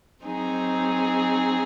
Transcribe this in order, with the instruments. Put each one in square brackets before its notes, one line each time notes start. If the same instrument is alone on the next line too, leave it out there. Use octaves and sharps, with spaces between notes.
[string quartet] F#3 C4 D#4 G#4